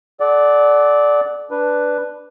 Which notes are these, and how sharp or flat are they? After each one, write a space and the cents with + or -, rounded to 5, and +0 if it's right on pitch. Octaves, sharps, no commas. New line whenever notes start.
A4 -40 D5 +0 F#5 +10
D4 +0 B4 +0